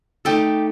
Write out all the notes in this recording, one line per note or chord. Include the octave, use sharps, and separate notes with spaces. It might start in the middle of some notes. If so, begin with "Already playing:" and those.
A3 D#4 G4 A4